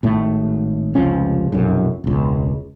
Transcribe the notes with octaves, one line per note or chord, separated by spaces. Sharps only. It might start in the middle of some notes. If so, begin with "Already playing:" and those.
G#1 A2 A3
F1 C#2 F3 C#4
F1 B1 F#2
E1 C#2